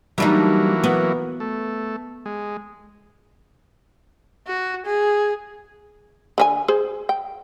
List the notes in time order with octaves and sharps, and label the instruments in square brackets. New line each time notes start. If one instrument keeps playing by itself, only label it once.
[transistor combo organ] E3 F#3 A#3 [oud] G3 D4 D#4
[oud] B3
[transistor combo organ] A3
G#3
[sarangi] F#4
G#4
[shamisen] D3 C#4 G#5
G#4 C5
G5